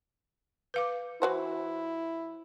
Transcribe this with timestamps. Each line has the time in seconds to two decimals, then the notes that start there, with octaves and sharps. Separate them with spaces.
0.74 B4 F5 D6
1.22 E3 E4 F#4 C5